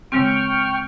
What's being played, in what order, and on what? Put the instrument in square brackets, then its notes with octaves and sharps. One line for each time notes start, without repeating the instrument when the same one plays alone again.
[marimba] C#3 G#3 C4 [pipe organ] G5 C#6 F6